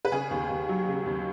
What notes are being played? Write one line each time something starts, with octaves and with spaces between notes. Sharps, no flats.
B4
C#3 G#4
D#2
D#2
F#3
C#3
D#2